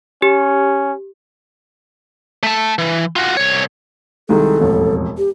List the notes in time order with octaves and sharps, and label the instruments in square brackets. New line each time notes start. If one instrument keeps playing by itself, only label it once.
[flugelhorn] C#4 [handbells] G4
[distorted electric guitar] A3 A5
E3
F4 F#4
C2 C#5
[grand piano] C2 D#3 G#3 [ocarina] A4
[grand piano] E1 A1 F2
[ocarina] G4